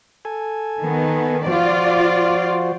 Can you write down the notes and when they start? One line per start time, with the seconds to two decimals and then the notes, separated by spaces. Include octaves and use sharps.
0.25 A4 G#5
0.80 D#3 B3
1.46 F3 F4 F#4 C5 D5